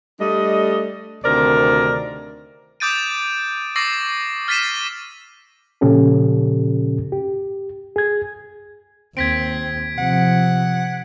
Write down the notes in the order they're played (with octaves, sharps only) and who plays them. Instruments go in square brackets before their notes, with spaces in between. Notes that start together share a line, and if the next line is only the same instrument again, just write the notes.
[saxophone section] G3 A3 D4 D#5
D2 C3 D#3 C4 A#4 D5
[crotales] D6 D#6 G6 A6 D7 D#7
C#6 D6 E6 A6 A#6 C7
F6 A6 B6 C7 D#7 E7
[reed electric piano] A#2 C#3 F3 C#4 G4 A4
G4
G#4 G#6
[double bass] D#2 [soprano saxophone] C4 [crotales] G#6 B6 D7
[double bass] C3 F3 [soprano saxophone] F#5